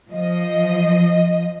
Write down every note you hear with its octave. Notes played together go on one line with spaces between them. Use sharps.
F3 D#5